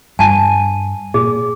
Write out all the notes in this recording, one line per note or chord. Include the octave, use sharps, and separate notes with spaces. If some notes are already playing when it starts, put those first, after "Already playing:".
G2 G#5 A5
A#2 G#4